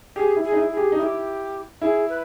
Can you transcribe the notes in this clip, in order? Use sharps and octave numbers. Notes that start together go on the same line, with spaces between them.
G4 G#4
E4
G#4
D#4
E4
G#4
G4
D#4
E4 G4 G#4
E4 G#4
B4